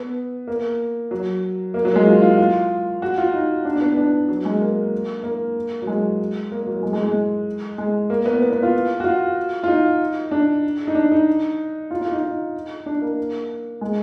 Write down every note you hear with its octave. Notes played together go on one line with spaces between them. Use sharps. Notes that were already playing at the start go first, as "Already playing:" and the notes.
Already playing: B3
A#3
F#3
A#3
F#3
G#3
F4
F4
F4
F#4
F4
D#4
D4
D4
B3
D4
F#3
G#3
A#3
A#3
F#3
G#3
A#3
F#3
G#3
G#3
G#3
G#3
A#3
B3
B3
B3
F4
F#4
F4
F4
D#4
D4
D#4
D4
D#4
F4
F4
D#4
D#4
D4
A#3
G#3